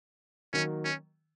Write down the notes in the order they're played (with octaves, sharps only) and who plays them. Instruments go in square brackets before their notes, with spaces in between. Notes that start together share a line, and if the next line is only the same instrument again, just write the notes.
[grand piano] D#3 F#3 A#3 [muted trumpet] C#4
[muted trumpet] C#4